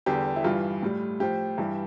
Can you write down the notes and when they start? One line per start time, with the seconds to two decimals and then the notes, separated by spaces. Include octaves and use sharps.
0.06 E2 D3 G3 G4
0.36 E4
0.44 G2 E3 G3 F4
0.83 A2 G3
1.20 A2 F3 G4
1.58 G2 E3 G3